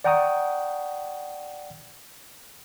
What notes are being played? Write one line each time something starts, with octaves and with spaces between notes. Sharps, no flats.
D5 F#5 G5 A#5 C#6 D#6